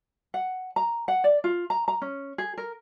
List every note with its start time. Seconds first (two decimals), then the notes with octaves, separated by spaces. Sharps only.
0.34 F#5
0.76 A#5
1.08 F#5
1.24 D5
1.44 F4
1.70 A#5
1.88 A#5
2.02 C#4
2.38 G#4
2.58 A#4